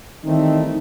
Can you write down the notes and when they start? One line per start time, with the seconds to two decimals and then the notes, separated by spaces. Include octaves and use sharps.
0.25 D#3 E3 G3 A3 C4 D#4